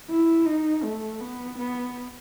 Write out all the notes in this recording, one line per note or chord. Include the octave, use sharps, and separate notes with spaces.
E4
D#4
A3
B3
B3